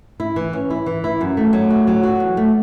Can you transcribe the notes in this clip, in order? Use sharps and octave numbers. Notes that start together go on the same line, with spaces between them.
E4
E3
C#4
E4
E3
E4
F#2
A3
F#3
F#4
F#3
F#4
E2
A3